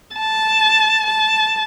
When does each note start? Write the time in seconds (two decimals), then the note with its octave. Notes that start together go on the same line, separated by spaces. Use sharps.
0.14 A5
1.06 A5